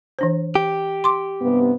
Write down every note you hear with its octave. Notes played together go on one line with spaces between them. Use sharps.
E3 D4 C5
G4
C6 D6
G2 C3 B3